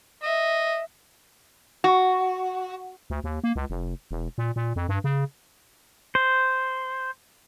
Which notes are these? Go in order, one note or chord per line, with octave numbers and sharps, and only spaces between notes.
D#5 E5
F#4
D2
D#2
A#3
C#2
F1
E1
A#2
A#2
F2
G2
C#3
C5